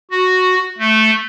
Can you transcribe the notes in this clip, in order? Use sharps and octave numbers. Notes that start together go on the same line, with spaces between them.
F#4
A3